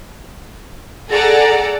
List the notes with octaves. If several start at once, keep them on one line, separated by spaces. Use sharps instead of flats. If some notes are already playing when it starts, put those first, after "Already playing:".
G#4 A4 D5 F#5 A#5